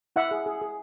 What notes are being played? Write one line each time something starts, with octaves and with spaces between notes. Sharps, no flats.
E4 E5 F#5
G#4
G#4
G#4